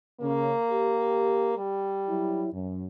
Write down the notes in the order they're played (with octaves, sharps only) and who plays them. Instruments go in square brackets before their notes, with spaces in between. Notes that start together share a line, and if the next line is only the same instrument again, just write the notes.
[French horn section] C#3 [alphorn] A#3
[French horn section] G4
[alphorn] G3
[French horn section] F#3 E4
F#2